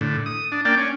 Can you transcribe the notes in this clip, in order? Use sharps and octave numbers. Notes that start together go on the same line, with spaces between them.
A2 D3
D#6
D4
A#3 D4 D5 G5
C#4